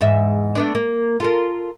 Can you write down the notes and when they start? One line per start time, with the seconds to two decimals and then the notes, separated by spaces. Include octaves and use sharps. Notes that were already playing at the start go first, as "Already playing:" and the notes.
0.01 E2 G#2 E5
0.55 A3 B3 D4
0.75 A#3
1.20 F4 A4 A#4